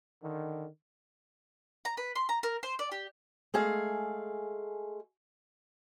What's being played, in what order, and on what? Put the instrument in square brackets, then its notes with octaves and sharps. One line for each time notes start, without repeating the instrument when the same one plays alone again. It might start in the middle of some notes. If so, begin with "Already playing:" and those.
[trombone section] D3 D#3
[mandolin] A#5
B4
C6
A#5
A#4
C5
D5
G4
[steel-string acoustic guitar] G#3 A3 G#4 F5